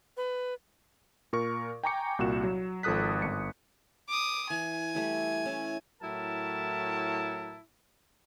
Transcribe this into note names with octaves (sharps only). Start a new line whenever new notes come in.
B4
A#2 A#4 C#6
G5 G#5 A#5 C#6 D6 C#7
C2 A#2 F#4 E7
F#3
G#1 F3 A4 D#6 F#6 B6
G1 C#7
D6 D#6
E3 G#5
G3 A3 E4
C#4 E4 A5
A2 F#3 E4 A#4 A5